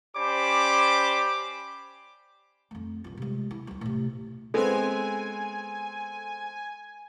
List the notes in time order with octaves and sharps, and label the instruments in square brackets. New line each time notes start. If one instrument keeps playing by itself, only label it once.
[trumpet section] C#4 G4 C5 D5 B5 D6
[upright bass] F2 A3
B1 F4
C3 G#3
E4
D2 G#3
A2 C3
[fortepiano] G#3 B3 C4 [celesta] A4 [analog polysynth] G#5